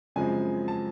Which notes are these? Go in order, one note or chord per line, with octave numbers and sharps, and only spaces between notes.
F#2 C#3 F3 G#3 C4 G#5
A5